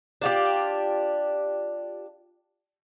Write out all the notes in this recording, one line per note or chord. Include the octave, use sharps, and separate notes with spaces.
D4 F4 G4